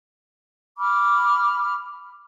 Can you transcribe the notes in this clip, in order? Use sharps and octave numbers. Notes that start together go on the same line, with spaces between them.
B5 D6 F6